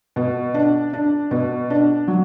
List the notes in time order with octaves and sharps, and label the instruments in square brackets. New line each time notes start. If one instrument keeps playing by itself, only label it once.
[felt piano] B2
D4
D4
B2
D4
F#3